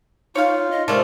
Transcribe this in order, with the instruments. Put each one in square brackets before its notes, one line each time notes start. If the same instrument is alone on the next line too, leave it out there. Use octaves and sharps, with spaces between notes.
[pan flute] D#4 [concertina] F4 [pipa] C#5 F5
[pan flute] D#5
[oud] C3 G#3 [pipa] A3 [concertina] F4 D5 [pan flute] A#4